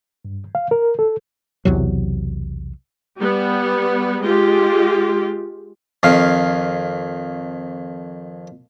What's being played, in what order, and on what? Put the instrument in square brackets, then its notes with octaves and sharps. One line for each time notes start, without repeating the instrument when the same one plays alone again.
[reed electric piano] G2
F5
A#4
A4
[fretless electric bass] B1 E2 C3 F#3
[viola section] G3 B3
G#3 F4 G4
[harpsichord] F2 D#3 F5